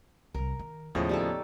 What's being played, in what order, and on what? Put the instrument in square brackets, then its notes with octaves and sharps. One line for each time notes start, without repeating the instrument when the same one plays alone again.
[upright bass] C2 G3 [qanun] A#4
[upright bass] D#3
[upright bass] D#2 B3 [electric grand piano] A2 C#3 F3 [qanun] G#4 C#5 D#5
[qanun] G3 D#4 A4